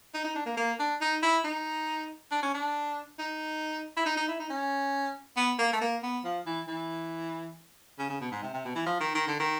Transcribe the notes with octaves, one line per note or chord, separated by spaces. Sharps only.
D#4
D#4
D4
A#3
A#3
D4
D#4
E4
D#4
D4
C#4
D4
D#4
E4
D#4
D#4
E4
D#4
C#4
B3
A#3
A3
A#3
B3
F3
E3
E3
C#3
C#3
B2
G#2
C3
C3
B2
E3
F3
D#3
D#3
D3
D#3